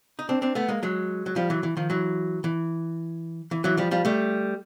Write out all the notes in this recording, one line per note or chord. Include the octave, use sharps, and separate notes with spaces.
D#4
C4 D4
C4 D4
A3 B3
G#3 A#3
F#3 G#3
F#3
F3 G3
E3 F#3
E3
D#3 F3
E3 F#3
E3
E3
E3 F#3
F3 G3
F3 G3
G3 A3